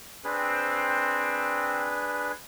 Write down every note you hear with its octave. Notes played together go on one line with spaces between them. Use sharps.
C4 D4 G#4 B4